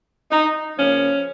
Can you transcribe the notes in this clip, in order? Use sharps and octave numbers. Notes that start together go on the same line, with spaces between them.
D#4
C#3 F3 A#3 C#4